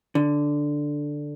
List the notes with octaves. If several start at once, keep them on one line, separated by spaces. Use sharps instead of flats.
D3